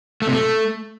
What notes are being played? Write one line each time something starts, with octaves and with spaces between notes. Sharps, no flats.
A3
C3
A3